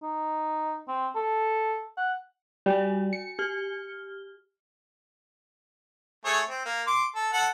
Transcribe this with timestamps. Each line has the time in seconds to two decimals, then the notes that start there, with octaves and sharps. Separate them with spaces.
0.03 D#4
0.88 C4
1.16 A4
1.97 F#5
2.66 G3 F#4 G#5
3.13 C#7
3.39 G4 F6 G7
6.25 A3 G#4 C#5
6.49 C4
6.65 A#3
6.87 C6 D6
7.16 A4
7.33 A4 F#5